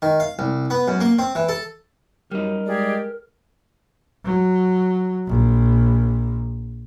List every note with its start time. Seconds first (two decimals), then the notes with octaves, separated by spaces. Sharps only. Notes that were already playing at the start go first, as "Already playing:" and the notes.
0.02 D#3
0.20 F5
0.39 C2
0.70 B3
0.88 F#2
1.01 A#3
1.19 C4
1.35 E3
1.49 A4
2.31 F#2 G3 D#4 A#4
2.67 G#3 G4 G#4 D5
4.24 F#3
5.27 A#1